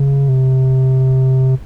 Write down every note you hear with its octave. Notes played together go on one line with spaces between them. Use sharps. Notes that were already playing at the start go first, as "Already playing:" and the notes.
Already playing: C#3
C3